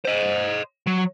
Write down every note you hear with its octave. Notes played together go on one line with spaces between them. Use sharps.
C5 D#5
F#3